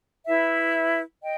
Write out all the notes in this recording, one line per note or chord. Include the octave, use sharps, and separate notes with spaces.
E4 B4 E5
D#5 G5